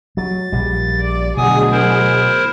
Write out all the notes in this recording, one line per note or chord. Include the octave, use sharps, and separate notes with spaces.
F#3 A6
A#1 G3
D5
D2 B2 F#3 G#4 G#5 D#6
E4 A#4 C5